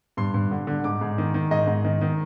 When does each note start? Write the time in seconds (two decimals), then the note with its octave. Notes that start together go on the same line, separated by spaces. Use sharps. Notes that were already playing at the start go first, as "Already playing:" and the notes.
0.17 G2 C6
0.34 G2
0.51 D3
0.67 D3
0.84 G#2 D6
1.01 G#2
1.18 D#3
1.34 D#3
1.51 G#2 D#5
1.67 G#2
1.85 D#3
2.01 D#3